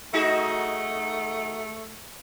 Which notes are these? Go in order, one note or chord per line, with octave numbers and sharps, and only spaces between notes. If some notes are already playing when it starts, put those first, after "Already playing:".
A3 D#4 F#4 G#4